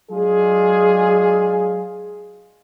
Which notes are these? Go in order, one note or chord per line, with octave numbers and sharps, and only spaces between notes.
F#3 G#3 D4 F4 G#4